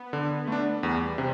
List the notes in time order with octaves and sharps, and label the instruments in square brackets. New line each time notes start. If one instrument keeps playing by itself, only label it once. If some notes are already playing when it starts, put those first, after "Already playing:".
Already playing: [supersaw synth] B3
[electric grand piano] D3
A3 D4
[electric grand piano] E2 [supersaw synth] G3
[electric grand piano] C3